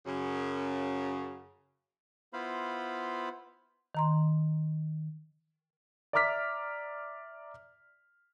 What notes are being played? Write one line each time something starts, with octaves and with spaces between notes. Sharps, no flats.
F#2 C#3
B3 E4 F4 C5 F5 B5
D#3 A#5 C6
D5 E5 A#5 D6 F6 B6